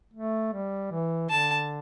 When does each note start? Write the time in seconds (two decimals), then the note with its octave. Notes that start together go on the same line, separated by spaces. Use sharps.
0.14 A3
0.53 G3
0.92 E3
1.30 D3 A5